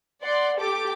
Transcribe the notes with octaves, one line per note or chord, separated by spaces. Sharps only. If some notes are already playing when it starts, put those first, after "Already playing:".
D5 F#5 C6
G4 A4 D6